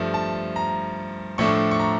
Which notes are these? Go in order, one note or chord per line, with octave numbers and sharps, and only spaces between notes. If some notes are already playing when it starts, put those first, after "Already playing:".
Already playing: G2 F3 A3
A5
A#5
A2 F3 A3 D4 C#6
C#6
A#5